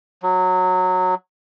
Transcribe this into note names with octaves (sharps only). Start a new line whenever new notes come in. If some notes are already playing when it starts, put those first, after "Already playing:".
F#3